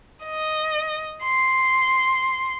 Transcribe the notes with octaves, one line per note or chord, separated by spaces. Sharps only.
D#5
C6